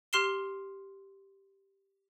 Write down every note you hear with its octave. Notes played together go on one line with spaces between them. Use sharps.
G4 C6 F6 C7 E7 G7